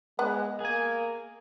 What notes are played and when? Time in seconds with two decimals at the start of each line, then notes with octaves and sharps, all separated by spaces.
0.19 G#3 B3 F#5
0.60 A#3 G#4 G#5